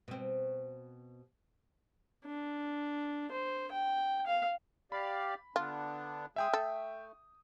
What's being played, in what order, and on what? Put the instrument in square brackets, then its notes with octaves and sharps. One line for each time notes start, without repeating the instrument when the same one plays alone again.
[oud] B2 C4
[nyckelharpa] D4
C5
G5
F5
[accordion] G4 D5 F5 [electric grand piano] B5
[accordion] D3 B3 D4 [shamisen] F4
[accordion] G#3 G#4 [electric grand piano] E5 G5 D#6
[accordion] A3 [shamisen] A4